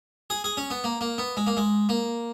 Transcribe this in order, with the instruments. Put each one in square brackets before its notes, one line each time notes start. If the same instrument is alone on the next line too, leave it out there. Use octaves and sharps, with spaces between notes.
[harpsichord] G#4
G#4
C#4
B3
A#3
A#3
B3
G#3
A#3
G#3
A#3